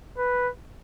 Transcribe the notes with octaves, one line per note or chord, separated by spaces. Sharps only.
B4